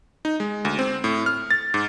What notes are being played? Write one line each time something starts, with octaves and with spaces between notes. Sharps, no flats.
D#4
G#3
D2
C4
A2
F6
A6
G#2